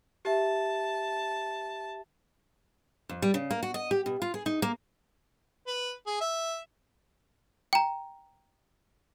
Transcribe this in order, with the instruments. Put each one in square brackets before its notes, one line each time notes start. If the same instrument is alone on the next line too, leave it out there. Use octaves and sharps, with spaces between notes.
[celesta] G4 E5 [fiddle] A5
[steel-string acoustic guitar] F2
G3
C#3
A#3
F#4
D#5
G4
B2
F4
G#4
D#4
A#3
[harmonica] B4
G#4
E5
[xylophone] G5 A#5